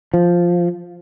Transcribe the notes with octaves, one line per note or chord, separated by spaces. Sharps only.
F3